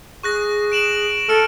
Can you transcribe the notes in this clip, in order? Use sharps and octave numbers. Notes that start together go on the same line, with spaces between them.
G#4 C#6 F#6 A#6
D7 E7 F#7
A4 F6 C#7 D7